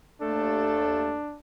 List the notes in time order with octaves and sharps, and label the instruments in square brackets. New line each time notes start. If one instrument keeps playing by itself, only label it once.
[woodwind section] D#2 A3 A4 [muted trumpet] D4